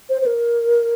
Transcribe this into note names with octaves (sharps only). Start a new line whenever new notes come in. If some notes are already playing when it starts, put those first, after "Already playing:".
C5
C5
A#4